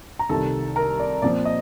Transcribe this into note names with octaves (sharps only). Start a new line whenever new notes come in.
A#5
C2 C3 D#3 A4 A5
A#4 A#5
D5
A#2 F3 C4 D5
D#5